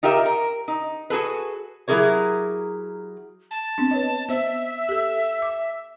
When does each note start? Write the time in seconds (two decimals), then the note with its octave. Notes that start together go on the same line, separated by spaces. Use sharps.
0.03 D#4 F4 G4 A#4 E5
0.26 A#4
0.68 D#4
1.10 F#4 G#4 A4 B4
1.88 F#3 E4 G4 G#4 A#4 C#5
3.51 A5
3.78 B3 C4 D4
3.91 B4 C#5 D#5
4.29 B3 C5 D#5 E5
4.89 G4 A4
5.42 D6